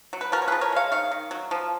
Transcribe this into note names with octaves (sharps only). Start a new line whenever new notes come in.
F#3
B4
F3 F#4 A#4
C#5
F3 G#4 B4
A#4 C#5
G#3 C#5 F5
D#3 C#5 F5
D#3
F#3
F3